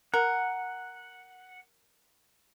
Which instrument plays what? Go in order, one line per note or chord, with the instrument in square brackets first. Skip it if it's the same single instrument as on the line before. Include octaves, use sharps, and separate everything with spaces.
[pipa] A#4 [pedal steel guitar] F#5